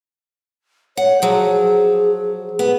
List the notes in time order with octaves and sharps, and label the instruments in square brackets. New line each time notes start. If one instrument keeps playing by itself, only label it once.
[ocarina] C#5 [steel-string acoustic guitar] F#5
[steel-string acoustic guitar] F3 F#3 [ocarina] G#4
[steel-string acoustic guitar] B3